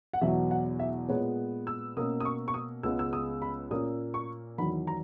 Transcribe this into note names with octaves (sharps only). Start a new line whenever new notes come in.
F#5
E2 B2 F#3 B3 E5
F#5
E5
A#2 G#3 B3 C#5
E6
B2 A#3 C#4 D#6
D#6
C#6
C#6
D#6
C#2 C#3 G#3 B3 E6
E6
D#6
B5
A#2 A#3 C#4 D#6
C#6
E2 D#3 F#3 B5
A#5